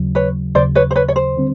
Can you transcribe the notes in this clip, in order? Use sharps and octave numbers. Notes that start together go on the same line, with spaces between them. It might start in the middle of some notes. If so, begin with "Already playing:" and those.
Already playing: D#2 C#3 F#3
B4 C#5
D#2 C#3 F#3 C5 D5
B4 C#5
C5
B4 C#5
C#5
C5
D3 G3 C4